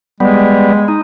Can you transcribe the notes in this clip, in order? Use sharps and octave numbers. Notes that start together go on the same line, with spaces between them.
G3 G#3 B3
D#4